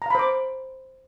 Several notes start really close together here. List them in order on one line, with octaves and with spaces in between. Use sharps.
A#5 F5 B5 C5 D6